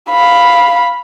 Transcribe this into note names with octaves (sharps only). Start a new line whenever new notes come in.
F5 B5